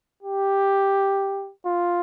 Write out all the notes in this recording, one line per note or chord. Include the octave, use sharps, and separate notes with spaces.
G4
F4